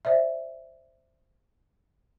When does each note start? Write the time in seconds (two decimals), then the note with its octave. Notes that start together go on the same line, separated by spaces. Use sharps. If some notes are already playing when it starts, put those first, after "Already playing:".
0.05 C5 D5 E5